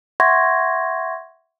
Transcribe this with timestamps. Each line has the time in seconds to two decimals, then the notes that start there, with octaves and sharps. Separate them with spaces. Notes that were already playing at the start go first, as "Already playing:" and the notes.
0.20 E5 F#5 C6 C#6 G#6 A#6